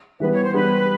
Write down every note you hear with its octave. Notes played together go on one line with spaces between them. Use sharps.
E3 G3 B3 B4
C#5
C5
G3 B3 D4 B4